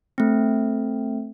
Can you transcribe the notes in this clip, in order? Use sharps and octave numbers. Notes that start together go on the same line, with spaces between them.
A3 C4